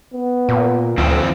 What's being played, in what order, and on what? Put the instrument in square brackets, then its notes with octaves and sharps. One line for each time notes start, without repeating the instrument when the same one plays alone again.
[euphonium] B3
[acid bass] A#2
[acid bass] D2 [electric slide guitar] E3 F3 C4